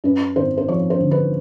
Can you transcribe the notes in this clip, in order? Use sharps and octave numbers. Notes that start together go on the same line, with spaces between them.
F#2 B4
G#1 C5
C5
F3 C#5
C5
D3
B4